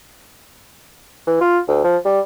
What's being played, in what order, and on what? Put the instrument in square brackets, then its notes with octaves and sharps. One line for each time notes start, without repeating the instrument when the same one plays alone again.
[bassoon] E3
F4
D2
F3
G3